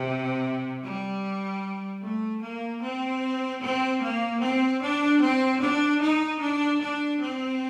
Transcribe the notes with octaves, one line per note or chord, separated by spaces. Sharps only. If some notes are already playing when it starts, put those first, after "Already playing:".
Already playing: C3
G3
A3
A#3
C4
C4
A#3
C4
D4
C4
D4
D#4
D4
D4
C4